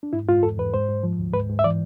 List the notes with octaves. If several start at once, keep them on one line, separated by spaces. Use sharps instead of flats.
D4
G#2 E4
G#2 F4
E2 A4
E2 B4
G#2 C5
G#2
F3
D2
G#2 B4
G#2
E5
E3 D5